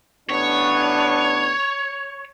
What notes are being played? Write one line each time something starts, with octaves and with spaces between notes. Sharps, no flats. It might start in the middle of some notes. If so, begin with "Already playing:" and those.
A1 B3 D4 C#5